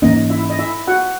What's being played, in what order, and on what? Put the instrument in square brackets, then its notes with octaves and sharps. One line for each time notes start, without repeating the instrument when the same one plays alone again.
[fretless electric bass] G#2 E3 A#3 C#4 [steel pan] D#4 D#5
[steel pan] E4 E5
D#5
E4 E5
F#4 F#5